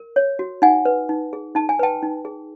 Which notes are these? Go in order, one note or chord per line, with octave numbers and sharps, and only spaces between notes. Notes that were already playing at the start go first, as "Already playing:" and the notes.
Already playing: A#4
C#5
F#4
D#4 F#5 G#5
B4
D#4
G#4
D#4 A5
G#5
B4 G5 A5
D#4
G#4